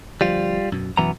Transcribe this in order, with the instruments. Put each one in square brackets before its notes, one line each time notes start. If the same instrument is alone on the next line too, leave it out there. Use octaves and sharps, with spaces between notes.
[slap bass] D2 F3 [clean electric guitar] G3 F4
[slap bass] F#2 B2
[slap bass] F#2 B2 [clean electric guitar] E3 B3 A#5